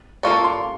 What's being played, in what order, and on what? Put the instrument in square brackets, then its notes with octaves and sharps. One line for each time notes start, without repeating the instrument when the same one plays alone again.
[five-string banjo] A#3 C#4 F4 A4 D5 [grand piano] C#6
[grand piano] C6